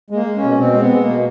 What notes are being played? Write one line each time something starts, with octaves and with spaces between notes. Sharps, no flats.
G#3 A#3
G#3
C#4
B2
B2 C4
G#3
B3
G#3
B2 A#3